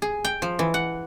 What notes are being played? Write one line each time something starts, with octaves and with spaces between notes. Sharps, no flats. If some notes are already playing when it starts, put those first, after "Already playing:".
G#4
G5
F3
E3
F#5